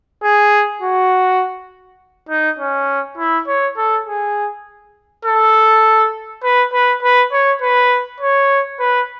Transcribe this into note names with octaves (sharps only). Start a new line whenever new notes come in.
G#4
F#4
D#4
C#4
E4
C#5
A4
G#4
A4
B4
B4
B4
C#5
B4
C#5
B4